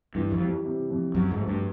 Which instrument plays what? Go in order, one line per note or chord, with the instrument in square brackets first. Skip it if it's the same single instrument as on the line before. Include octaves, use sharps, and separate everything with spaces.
[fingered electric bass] G2 [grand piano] E3
[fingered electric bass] F2
[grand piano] G3
C3
F2
[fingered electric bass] F#2 [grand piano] F#3
[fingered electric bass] G#2
[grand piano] A3
[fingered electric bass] G2